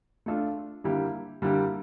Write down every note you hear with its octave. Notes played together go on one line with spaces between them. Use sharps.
A3 D4 F4 A4
D3 G3 A#3 E4 G4
D3 G3 A#3 E4 G4